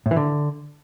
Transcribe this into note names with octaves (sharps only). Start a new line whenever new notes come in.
A2
E3
D3